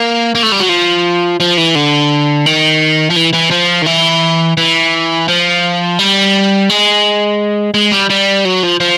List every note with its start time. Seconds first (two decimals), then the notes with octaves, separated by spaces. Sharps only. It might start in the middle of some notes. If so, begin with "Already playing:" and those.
Already playing: A#3
0.35 A#3
0.43 A3
0.52 G3
0.60 F#3
0.69 F3
1.40 F3
1.58 E3
1.75 D3
2.46 D#3
3.10 F3
3.17 E3
3.34 E3
3.51 F3
3.83 D#3
3.87 E3
4.57 E3
5.28 F3
5.99 G3
6.69 G#3
7.74 G#3
7.92 G3
8.10 G3
8.45 F#3
8.63 F3
8.80 F3